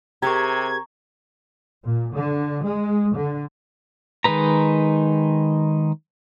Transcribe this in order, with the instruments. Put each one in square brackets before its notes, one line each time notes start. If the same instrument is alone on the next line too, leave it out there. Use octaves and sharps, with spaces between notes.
[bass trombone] C3 [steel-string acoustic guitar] G4 G#4 A#4 [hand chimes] A#5 C#6 [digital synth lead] G#6
[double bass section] A#2
D3
G#3
D3
[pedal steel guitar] D#3 G#3 D#4 B4 A#5